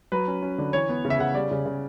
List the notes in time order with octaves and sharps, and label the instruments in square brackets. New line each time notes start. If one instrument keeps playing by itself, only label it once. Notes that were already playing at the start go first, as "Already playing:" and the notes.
[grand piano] F#3 B4
C#4
C#4
D3
E3 C#5
B3
C#3
E5
C#3 F#5
G3 D5
C#3
C#3